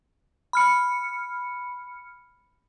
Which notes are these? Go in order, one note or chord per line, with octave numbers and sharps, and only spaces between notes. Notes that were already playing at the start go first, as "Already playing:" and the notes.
B5 F6 C#7